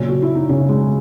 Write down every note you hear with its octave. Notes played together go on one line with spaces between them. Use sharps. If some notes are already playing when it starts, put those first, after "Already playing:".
Already playing: A#2 C#3 F#3 C#4
F#4
E4
D#4
C#3 C#4
G#3